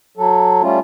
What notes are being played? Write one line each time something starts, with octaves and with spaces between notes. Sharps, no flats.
F#3 A4
G3 A3 C#4 F4